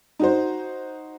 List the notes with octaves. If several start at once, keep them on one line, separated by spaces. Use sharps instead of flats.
D#4 F#4 C5